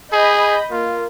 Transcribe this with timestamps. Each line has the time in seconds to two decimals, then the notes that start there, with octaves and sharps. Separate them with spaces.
0.13 G#4 D#5 B5 G6
0.72 A#3 F4